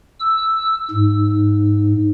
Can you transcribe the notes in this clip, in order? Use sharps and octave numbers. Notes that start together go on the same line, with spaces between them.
E6
G#2